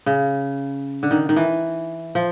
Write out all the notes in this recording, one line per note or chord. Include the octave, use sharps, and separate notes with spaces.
C#3
D3
D#3
D#3
E3
F3